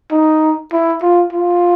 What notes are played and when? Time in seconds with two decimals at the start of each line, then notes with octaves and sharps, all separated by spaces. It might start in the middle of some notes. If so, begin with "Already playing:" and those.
0.12 D#4
0.73 E4
1.02 F4
1.33 F4